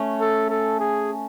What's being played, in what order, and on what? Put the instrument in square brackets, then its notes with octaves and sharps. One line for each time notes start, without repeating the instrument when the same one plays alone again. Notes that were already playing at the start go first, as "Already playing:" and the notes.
Already playing: [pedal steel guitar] A3 C#4
[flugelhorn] A4
A4
G#4